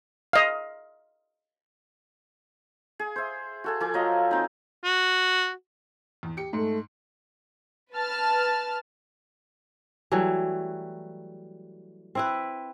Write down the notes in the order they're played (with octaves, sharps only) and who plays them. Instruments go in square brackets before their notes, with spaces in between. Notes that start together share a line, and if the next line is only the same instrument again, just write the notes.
[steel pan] D#5 F5
[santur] G#4
C5 E5
F#4 A4 G#5
F3 A4 G#5 D6
F3 F#3 D#5 F5
C4 D#4
[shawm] F#4
[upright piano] E2
G4 C#7
[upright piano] G#2 [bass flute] A3
[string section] B4 A5 F6
[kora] E3 F#3 G3 A3
C4 E4 B4